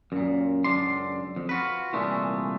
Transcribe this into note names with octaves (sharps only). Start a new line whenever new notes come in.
F#2 A#2
C#2 F#2 F#3 D4 D5 C6
F2
F4 F#4 B4
C2 A#2 E3 G#3 A3